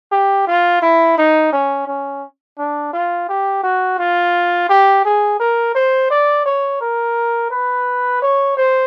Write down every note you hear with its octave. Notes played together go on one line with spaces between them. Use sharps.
G4
F4
E4
D#4
C#4
C#4
D4
F4
G4
F#4
F4
G4
G#4
A#4
C5
D5
C#5
A#4
B4
C#5
C5